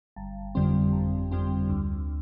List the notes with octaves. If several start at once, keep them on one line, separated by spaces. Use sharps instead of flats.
G1
F2 D3 G3 C4
G1
F2 D3 G3 C4
D2